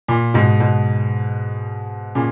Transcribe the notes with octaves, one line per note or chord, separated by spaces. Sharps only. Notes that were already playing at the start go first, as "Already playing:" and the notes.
A#2
G#2 B2
G#2 B2
A#2 C#3